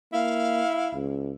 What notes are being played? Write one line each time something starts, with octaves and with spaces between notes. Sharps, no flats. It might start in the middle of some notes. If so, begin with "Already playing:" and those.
A#3 E4 F5
C#2